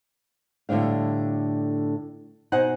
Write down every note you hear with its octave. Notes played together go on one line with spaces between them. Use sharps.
A2 D3 G3 D4 F5
B2 D#4 C5 F#5 G#5